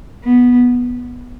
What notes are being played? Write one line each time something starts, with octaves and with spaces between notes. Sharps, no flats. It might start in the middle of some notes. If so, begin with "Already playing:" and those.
B3